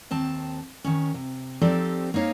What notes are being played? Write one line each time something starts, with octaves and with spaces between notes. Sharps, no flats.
D#2 C4 A5
D#3 C#4
C3
F3 C4 D#4 G4 A4 D5
A#3 C4 D#4 C#5 F5